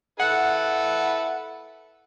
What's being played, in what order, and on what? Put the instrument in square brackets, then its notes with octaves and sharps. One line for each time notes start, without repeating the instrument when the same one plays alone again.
[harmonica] E4 A4 B4 [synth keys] F#5